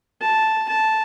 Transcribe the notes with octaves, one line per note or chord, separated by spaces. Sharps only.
A5
A5